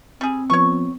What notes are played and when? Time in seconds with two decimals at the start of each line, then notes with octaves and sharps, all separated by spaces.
0.21 G3 C4 G#4
0.50 F3 B3 C#5 C#6